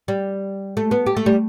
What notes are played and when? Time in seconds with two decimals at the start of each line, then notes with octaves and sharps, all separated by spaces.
0.08 G3
0.77 A3
0.91 B3
1.06 G4
1.17 A3
1.26 G3